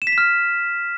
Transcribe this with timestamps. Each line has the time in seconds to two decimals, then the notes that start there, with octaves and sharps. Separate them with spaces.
0.02 E7
0.07 B6
0.12 E7
0.18 F6